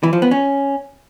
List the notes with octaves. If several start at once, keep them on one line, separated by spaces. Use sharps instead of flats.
E3
F3
B3
C#4